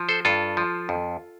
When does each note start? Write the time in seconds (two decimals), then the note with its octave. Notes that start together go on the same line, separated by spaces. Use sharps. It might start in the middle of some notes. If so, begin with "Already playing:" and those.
Already playing: F3
0.09 A4 C5
0.25 G2 F4 A4
0.57 F3
0.89 F2